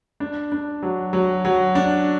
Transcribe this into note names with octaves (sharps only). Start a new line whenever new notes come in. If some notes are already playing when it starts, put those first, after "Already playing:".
D4
D4
F#3
F#3
F#3
D4